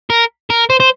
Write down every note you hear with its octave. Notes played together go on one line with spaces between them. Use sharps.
A#4
A#4
C5
C5